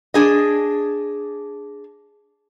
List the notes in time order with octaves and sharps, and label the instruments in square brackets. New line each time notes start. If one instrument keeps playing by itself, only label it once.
[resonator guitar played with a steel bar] D4 G#4 D#5